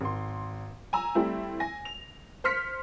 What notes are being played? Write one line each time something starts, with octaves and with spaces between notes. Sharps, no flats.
G#1 C6
G#5 A#5 E6
G3 A3 C4 E4
G#5 A#6
F7
C5 C6 F6 B6 C#7